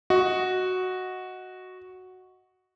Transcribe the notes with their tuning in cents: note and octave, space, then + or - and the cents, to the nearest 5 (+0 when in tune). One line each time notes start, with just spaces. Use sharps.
F#4 +0 D#5 +10